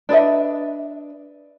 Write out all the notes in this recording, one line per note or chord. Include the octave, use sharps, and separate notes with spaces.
D4 B4 D#5 E5